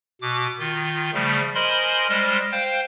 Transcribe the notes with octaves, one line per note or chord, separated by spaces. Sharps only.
B2 D6
D#3 F4
C#3 F3 G3 A3
A#4 C5 D#5 G#5 B5 C6
G3 G#3 C5 D#5 F6
C5 F5 G5